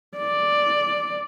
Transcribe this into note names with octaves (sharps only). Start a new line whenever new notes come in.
D5